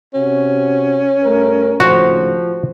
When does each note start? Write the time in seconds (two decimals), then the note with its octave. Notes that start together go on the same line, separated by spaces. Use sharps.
0.14 C3 C#4 F#4
1.23 G2 A3 A#4
1.80 G#1 A2 C#3 F3 F#4